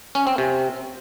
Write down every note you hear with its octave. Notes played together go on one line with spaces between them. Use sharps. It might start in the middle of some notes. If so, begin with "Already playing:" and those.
C#4
C4
C3